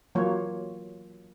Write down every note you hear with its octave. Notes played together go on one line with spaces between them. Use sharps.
E3 F#3 A#3 F4 F#4 C#5